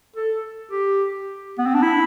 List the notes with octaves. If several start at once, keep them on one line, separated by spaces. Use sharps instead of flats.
A4
G4
B3
C4
D4
E4